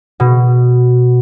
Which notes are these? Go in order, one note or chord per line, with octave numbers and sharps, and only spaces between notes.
B2